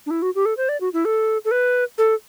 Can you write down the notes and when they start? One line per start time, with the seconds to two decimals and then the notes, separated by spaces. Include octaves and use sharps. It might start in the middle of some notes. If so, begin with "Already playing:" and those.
0.06 D4
0.11 E4
0.22 F#4
0.35 G4
0.46 A4
0.57 C5
0.69 D5
0.81 F#4
0.93 E4
1.05 A4
1.45 A4
1.51 B4
1.98 A4